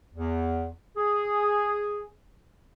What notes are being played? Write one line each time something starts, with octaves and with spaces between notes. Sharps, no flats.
E2
G#4